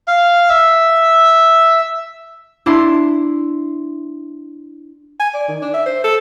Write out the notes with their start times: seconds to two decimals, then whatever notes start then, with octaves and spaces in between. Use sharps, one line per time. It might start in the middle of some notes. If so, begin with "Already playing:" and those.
0.08 F5
0.49 E5
2.66 D4 E4 C6
5.20 G#5
5.34 D5
5.48 D#3
5.62 D4
5.74 E5
5.86 C5
6.04 A4